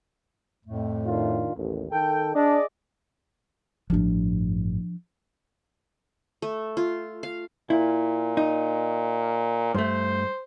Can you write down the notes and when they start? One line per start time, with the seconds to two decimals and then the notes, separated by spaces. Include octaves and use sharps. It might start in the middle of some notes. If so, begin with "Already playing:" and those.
0.66 F2 A2 A3
1.06 D#3 D4 F4
1.55 A1 D#2
1.91 D#3 A4 G5
2.35 D4 G#4 D5 D#5
3.90 A1 G2 F3 D4
6.42 A3
6.77 F4
7.23 F5
7.70 A#2 E4
8.37 D#4
9.75 G2 A3 C5